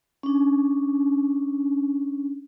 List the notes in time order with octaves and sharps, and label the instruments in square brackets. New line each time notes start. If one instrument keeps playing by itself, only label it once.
[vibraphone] C#4 D4